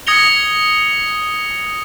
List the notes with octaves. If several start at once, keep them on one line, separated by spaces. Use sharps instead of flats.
D#6 G#6 A#6 C#7 F7 G7